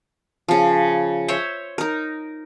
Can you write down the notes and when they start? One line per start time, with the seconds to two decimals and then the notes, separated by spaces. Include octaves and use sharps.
0.48 C#3 F3
1.28 C5 C#5 E5
1.78 D#4 A#4